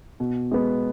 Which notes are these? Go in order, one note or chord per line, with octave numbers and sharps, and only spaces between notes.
B2
G#3 B3